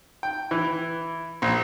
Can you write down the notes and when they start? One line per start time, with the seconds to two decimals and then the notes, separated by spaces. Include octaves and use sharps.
0.23 G5
0.51 E3
1.42 A#1